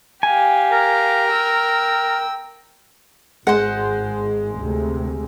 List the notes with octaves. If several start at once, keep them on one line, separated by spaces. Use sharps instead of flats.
G4 F5 G#5
A#4
G5 E6
G#1 G#3 C5 F#5
D2 C3